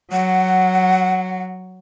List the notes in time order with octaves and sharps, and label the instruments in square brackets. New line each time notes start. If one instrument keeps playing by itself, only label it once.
[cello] F#3 [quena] F#5